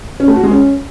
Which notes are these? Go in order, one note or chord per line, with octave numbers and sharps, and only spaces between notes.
C#4
A3
F#4
G#3
C#4